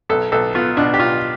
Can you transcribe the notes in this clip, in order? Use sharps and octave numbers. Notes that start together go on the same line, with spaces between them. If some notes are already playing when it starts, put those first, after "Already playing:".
B1 A4
B1 A4
B3 F4
B2 D4
G4
B1 F4